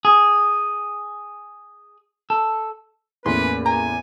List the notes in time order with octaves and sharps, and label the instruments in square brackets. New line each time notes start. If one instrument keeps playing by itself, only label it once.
[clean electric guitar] G#4
A4
[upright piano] E2 A2 C#4 [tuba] A#3 [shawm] B4 [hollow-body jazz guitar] C6
[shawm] G#5 [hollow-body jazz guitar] A#5